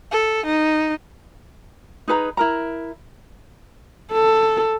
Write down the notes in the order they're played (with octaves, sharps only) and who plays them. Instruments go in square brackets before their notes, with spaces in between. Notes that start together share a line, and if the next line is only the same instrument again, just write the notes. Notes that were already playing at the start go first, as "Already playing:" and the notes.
[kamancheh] A4
D#4
[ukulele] D#4 G#4 B4 A#5
E4 A#4 A#5
[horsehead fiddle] A4